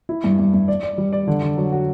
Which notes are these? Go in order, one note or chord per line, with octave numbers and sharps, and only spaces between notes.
E4
G2
G2
G2
D5
D5
G3
D5
D3
D3
F#3
F#4